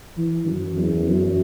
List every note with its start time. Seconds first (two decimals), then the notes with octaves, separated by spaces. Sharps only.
0.17 E3
0.47 F#2
0.78 E2
1.08 F#2